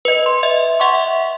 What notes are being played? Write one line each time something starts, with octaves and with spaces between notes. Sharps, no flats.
B4 D#5
C6
D#5 E5
E5 F#5 C6 C#6